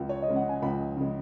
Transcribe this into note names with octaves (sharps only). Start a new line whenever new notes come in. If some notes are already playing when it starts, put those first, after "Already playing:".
Already playing: C#2
C#5
D#5
C#3 G#3
F#5
G#5
C#2 B5
C#3 G#3